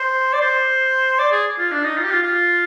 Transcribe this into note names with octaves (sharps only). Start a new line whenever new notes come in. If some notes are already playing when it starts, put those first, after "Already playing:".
Already playing: C5
D5
C5
D5
G#4
F4
D4
D#4
F4
G4
F4
F4